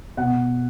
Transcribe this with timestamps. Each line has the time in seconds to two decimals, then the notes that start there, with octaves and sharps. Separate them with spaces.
0.17 B2 F#5